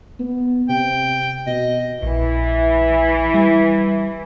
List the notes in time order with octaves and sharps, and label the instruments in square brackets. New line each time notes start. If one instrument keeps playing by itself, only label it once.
[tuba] B3
[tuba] C3 [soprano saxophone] G5
[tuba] B2 [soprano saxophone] D#5
[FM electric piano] A#1 [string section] E3
[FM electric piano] G3